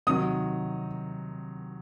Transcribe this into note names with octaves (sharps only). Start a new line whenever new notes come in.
C3 D#3 F#3 D#6